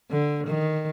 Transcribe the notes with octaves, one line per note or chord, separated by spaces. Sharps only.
D3
D#3